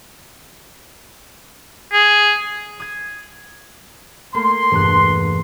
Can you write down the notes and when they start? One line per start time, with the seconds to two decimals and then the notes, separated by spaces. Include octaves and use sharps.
1.93 G#4
2.80 D#6 G#6
4.34 A3 A#3 C6
4.71 E1 G2 F#6